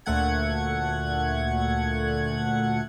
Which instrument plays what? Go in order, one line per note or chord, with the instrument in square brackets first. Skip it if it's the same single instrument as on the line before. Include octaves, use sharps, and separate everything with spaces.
[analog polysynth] D2 A#2 A3 F#5 G#6